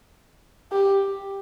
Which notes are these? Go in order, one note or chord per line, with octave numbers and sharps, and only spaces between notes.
G4